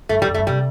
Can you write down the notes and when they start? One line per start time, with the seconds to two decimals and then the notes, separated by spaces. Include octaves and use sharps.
0.09 G2 A3
0.19 A2 G3
0.29 F#2
0.34 A3
0.38 G2
0.47 C3 G3